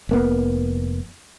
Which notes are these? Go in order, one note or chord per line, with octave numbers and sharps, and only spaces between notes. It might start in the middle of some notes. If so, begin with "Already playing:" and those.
F1 A#3 B3